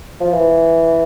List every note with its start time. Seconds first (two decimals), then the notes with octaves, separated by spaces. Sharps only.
0.20 F3
0.33 E3